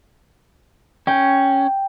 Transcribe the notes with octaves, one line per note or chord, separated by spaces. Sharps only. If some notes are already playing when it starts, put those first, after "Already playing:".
C#4 G5